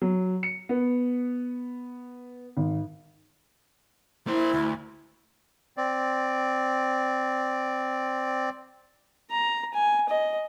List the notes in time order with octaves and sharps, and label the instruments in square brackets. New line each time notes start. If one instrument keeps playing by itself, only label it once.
[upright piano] F#3
C#7
B3
G#1
[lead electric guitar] A#3 C5 [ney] E4
[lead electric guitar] D2
[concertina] C4 D5
[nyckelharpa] A#5
G#5
D#5